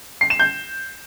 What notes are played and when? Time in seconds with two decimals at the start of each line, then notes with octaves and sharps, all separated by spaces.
0.21 C7
0.30 E7
0.40 G6